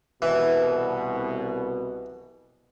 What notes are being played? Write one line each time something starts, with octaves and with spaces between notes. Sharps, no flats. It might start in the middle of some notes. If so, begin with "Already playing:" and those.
C2 B2 E3